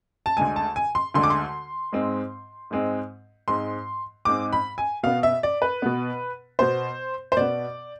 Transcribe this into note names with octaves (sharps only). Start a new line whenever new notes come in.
A5
D2 D3 G#3 G#5
A5
G#5
C6
D2 D3 G#3 C6
D6
C6
G#2 G#3 C4
G#2 G#3 C4
G#2 G#3 C4 C6
G#2 G#3 C4 D6
B5
G#5
B2 B3 F5
E5
D5
B4
B2 B3
B2 B3 C5
C5
B2 B3 D5